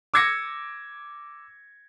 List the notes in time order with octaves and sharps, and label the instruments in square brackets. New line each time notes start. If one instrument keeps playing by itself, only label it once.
[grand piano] D6 E6 G#6 A#6 C#7